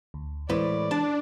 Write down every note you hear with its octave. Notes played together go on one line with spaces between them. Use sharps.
D2
A2 E3 G#3 B4 C5 D5
D4 A5